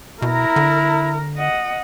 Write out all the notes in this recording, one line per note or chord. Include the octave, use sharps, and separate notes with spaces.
B2 E4 A#4 A#5
D3
D#5 F#5